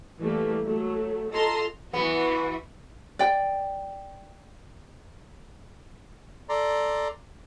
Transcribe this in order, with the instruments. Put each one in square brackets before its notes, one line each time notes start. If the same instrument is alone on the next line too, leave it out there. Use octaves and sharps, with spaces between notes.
[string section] E3 G3 A3 A#3
F#3 A3
F4 A4 D#5 A5 A#5 C6
[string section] E3 F#4 [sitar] B3
[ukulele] D5 G5
[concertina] A4 D5 A#5 C6